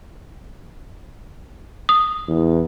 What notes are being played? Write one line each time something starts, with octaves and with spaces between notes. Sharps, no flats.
D#6
E2